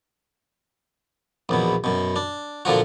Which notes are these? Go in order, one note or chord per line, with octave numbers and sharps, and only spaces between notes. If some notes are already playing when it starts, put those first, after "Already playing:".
A#1 E2 B2
F#2 B2
D4
A#2 D3 F3 F#4